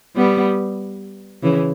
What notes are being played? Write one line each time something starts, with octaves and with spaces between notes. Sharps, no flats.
G3 B3
C#3 E3